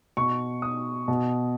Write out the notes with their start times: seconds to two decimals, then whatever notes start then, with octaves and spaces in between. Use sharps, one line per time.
0.17 B2 C#6
0.62 D#6
1.08 B2